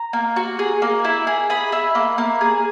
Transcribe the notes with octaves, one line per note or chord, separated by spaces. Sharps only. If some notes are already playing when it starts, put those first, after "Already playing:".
Already playing: A#5
A#3
F#4
G#4
A#3
E4
G#4
G#4 B5
E4
A#3
A#3
G#4